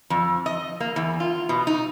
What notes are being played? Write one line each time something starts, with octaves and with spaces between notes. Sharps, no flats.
F2
D#5
A#3
E2
F4
B2
D#4